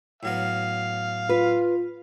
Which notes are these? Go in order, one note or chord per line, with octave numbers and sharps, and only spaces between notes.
A2 F#3 B3 F5
F4 B4